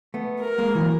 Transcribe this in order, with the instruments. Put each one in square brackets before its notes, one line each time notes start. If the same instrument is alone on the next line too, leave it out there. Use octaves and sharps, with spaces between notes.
[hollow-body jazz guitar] A3 B3
[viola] A#4
[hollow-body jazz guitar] G#3 A#3
E3 F#3